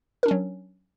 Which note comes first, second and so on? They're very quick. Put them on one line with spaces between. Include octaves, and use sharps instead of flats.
A#4 D4 C#4 F#3